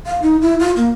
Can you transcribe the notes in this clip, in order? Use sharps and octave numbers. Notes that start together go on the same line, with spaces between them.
F5
D#4
E4
F4
A#3